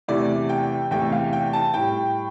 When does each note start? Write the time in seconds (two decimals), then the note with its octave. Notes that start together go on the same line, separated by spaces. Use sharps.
0.08 E2 C3 E3 A3 D5
0.49 G5
0.91 E2 C3 E3 A3 G5
1.12 F5
1.33 G5
1.53 A5
1.74 A2 G3 G5